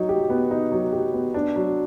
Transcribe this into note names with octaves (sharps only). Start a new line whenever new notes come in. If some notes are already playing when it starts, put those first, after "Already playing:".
Already playing: F#3 D#4
G4
B3
D#4
F#3
G4
B3
D4
F#3